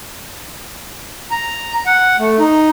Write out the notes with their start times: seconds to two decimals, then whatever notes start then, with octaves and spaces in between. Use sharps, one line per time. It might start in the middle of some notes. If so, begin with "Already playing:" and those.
1.31 A#5
1.86 F#5
2.19 A3
2.39 D#4